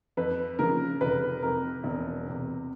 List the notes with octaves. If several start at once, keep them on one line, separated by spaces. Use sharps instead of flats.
F2 B4
C#3 F3 A#4
F1 B4
F2 C3 A#4
E1
E2 C3